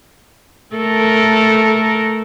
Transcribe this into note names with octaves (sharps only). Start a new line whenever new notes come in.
A3 A4 A#4